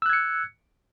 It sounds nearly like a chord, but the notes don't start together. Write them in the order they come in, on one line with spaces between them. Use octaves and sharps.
E6 F#6 G#6 C#7